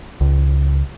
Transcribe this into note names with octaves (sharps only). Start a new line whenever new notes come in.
C#2